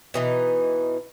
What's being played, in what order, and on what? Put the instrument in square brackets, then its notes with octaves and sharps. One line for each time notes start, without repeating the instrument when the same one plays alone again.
[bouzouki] B2 E3 D#4